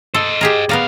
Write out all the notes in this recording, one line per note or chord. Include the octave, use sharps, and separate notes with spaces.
A4 C5 D#5
G4 G#4 A#4
A2 B3 A#4 D5 F5